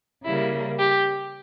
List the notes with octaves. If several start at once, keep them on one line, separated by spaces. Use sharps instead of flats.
C#3 G3 A#3 E4
G4